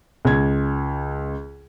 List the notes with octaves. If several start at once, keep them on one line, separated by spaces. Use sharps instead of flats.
C#2 G#6